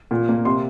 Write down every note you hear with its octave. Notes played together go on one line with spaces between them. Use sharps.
A#2
A#3
C3 C6